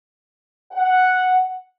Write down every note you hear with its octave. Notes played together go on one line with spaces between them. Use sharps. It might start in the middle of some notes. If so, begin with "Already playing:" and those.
F#5